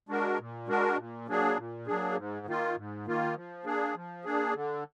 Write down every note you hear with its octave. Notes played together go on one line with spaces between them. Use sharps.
G#3 D4 F#4 A#4
A#2
G#3 D4 F#4 A#4
A#2
F#3 A#3 D4 G#4
A#2
F#3 A#3 D4 G#4
G#2
D#3 A#3 F4
G#2
D#3 A#3 F4
F3
A#3 D4 G#4
F3
A#3 D4 G#4
D3